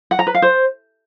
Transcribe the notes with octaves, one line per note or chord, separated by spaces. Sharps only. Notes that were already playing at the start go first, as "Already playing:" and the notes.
F#5
A#5
B4
F5
C5